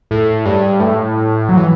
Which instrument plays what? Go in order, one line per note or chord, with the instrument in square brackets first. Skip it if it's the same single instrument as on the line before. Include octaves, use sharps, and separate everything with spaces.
[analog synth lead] A2
G2
A2
F#3
E3